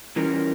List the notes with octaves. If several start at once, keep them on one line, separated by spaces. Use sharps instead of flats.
E3 G3 C#4 F4 A#4